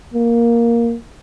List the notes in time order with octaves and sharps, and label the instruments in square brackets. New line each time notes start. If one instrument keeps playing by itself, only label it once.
[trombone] A#3